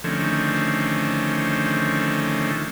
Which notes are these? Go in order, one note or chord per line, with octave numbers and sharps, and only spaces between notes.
D3 D#3 F3 A3 C4 C#4